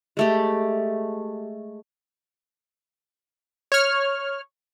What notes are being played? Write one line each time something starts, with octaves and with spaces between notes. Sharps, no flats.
G#3 A3 G4
C#5 F6